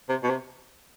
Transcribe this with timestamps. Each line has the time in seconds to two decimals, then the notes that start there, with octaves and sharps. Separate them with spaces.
0.09 C3
0.23 B2
0.30 C3